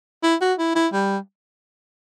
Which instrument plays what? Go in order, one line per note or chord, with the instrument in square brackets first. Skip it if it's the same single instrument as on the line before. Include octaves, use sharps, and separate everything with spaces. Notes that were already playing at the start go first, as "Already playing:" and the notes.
[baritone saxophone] E4
F#4
E4
E4
G3